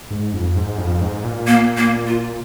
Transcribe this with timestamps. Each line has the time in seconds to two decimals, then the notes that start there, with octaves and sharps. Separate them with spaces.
0.10 G#2
0.33 F2
0.56 G#2
0.78 F2
1.01 G#2
1.24 A#2
1.47 A#3
1.77 A#3
2.07 F4